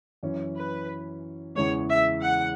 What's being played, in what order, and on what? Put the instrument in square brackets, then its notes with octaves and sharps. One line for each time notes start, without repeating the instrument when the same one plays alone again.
[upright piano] F#2 E3 C#4
[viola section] B4
[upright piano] E2 C#3 E3 G#3 [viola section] C#5
[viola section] E5
F#5